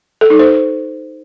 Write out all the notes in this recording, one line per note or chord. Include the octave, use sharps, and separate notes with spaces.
A4
D#4
C5